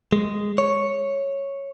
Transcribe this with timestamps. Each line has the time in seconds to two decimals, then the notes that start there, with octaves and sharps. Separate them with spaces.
0.13 G#3
0.58 C#5